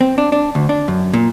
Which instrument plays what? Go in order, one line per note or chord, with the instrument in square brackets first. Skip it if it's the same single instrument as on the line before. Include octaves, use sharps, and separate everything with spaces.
[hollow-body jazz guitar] C4
D4
D4
D2
D4
F#2
A#2